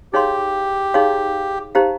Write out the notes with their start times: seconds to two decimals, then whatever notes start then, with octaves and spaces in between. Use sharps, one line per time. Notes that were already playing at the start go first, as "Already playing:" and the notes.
0.13 D#4 G4 G#4 C#5 F5 C6
0.94 D#4 G#4 C#5 F5 C6
1.75 D#4 G4 C5 F5 A#5